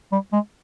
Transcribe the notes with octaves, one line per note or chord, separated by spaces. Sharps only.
G3
G#3